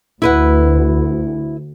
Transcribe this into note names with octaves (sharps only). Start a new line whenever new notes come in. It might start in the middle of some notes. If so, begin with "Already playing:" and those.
D2 E4 B4 F#5